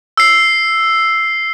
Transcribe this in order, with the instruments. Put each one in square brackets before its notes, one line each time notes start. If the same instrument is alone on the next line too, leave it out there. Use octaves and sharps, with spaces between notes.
[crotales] E6 C7